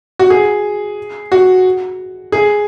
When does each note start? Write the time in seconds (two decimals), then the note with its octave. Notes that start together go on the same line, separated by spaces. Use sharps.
0.19 F#4
0.30 G#4
1.32 F#4
2.32 G#4